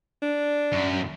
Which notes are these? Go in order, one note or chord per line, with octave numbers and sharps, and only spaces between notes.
D4
F#2